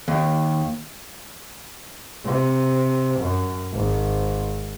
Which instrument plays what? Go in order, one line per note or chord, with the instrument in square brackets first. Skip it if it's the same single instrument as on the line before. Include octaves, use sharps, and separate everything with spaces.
[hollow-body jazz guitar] D#2
[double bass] C3
F#2
G#1